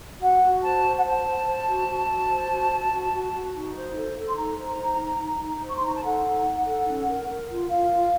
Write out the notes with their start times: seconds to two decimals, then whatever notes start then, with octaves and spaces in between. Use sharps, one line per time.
0.22 F#4 F#5
0.43 F#4
0.63 C5 A5
0.85 C5
0.98 F#5
1.04 C5 A5
1.25 C5
1.47 C5
1.67 F#4
1.88 F#4
2.09 F#4
2.30 C5
2.50 F#4
2.71 F#4
2.93 F#4
3.13 F#4
3.33 F#4
3.55 D#4
3.75 C5
3.96 A4
4.17 A4
4.28 C6
4.37 D#4 A#5
4.58 C5
4.79 D#4
5.00 D#4
5.20 D#4
5.42 D#4
5.62 C5
5.68 C#6
5.77 C6
5.83 D#4 A#5
5.95 A5
6.03 A4 F#5
6.24 D#4
6.45 D#4
6.66 A4
6.87 C#4
7.08 A#4
7.28 A#4
7.49 F4
7.70 F4 F5
7.91 F4